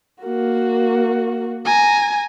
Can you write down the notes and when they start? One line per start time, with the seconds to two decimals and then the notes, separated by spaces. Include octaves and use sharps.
0.23 A#3 F#4
1.65 G#5 A#5